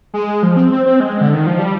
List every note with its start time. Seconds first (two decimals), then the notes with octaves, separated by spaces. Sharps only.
0.14 G#3
0.43 F3
0.57 C4
0.72 C4
0.86 C4
1.00 G#3
1.21 D3
1.34 D#3
1.46 F3
1.59 G3